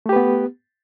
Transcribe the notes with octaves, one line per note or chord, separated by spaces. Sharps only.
A3 B3 G4 B4